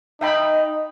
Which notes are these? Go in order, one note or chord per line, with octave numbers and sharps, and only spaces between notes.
D#4 D#5 E5 G5 B5